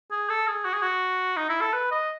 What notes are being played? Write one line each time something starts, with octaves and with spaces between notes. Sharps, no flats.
G#4
A4
G#4
F#4
G#4
F#4
D#4
E4
A4
B4
D#5